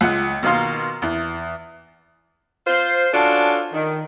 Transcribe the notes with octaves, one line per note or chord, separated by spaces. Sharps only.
C#2 F#5
B2 D#3 A#3 F5 C6
E2
F4 C5
C#4 D4 F4 F#4 A4
D#3